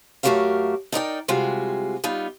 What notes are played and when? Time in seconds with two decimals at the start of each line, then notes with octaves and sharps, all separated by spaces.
0.23 F#2 A3 F#4 G4 A#4 F5
0.92 D#4 A#4 D5 G5
1.28 C3 G3 G#3 F4 F#4
2.04 G3 B3 D#4 F4